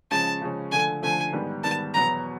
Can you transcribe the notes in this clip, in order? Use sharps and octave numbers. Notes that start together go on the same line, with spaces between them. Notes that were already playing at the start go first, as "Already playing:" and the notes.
C#3 F3 G#3 C#4 A5
C#3 F3 G#3 C#4
D3 F3 A3 G#5
D3 F3 A3 G#5
G#2 D#3 G3 B3
G#2 D#3 G3 B3 A5
E2 B2 F#3 B3 A#5